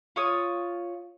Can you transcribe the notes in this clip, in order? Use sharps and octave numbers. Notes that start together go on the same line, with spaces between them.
F4 C#5 D#6